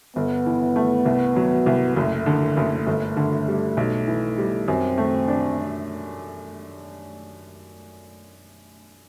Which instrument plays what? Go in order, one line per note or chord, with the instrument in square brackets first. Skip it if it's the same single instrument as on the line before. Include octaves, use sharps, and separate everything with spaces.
[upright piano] G1 [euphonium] B3
[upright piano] E3
A3
C2
F#3
C2
[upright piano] F#1 [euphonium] A3
[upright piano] D3
F#1
G1
D3
G3
B1
E3
G3
[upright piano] F#2 [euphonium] C4
[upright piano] A3
D4